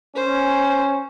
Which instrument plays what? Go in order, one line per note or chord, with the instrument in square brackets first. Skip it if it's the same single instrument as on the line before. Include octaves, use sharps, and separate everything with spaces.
[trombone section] C#4 [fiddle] C5